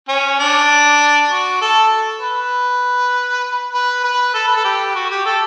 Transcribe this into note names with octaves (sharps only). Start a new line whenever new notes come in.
C#4
D4
F#4
A4
B4
B4
B4
A4
B4
A4
G4
F#4
G4
A4